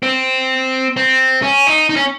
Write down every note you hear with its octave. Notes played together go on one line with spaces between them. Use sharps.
C4
C4
C#4
D#4
D#4
C#4